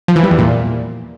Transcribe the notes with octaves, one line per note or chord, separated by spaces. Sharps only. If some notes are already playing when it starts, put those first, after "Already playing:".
F3
E3
G3
E2
A#2